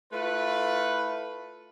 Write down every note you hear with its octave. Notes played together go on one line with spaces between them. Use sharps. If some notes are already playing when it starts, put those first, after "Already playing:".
A3 E4 F4 B4